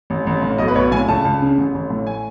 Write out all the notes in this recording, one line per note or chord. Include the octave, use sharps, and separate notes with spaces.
A1
A1
A2
B1 D#5
B4
B1 C#5
A2 G#5
C#2 A5
C#2
C#3
A1
A1
A2
G#5